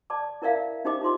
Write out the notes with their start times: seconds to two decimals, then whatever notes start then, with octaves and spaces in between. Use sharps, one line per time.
0.10 D5 A5 D6
0.42 E4 A#4 D5 E5 F5
0.85 D4 D#4 G4 C5 D#5 D6
1.01 D#4 F4 C6 D6